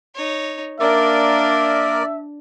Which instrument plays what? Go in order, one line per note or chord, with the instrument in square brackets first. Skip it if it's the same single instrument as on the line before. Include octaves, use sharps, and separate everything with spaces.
[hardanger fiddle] D#4 C#5
[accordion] A#3 A#4 [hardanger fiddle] D4 [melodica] D5 [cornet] E5